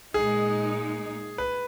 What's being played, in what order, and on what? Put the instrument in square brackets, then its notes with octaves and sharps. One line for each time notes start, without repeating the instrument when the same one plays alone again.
[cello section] A#2 G#3 D#4 [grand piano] G#4
[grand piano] B4